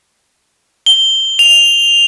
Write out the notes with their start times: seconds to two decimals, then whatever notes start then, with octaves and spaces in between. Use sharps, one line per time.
0.86 G7
1.39 F7